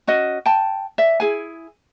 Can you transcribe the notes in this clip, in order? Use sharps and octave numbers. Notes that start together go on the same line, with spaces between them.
C#4 F#4 D#5
G5 A5
D5 E5
E4 G#4 G#5